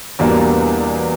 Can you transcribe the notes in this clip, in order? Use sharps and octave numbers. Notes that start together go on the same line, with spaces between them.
E2 B2 G3 A#3 D4